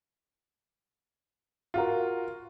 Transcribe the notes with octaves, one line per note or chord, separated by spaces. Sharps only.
F4 F#4 A#4